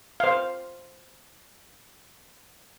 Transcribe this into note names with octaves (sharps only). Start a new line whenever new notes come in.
C5 F5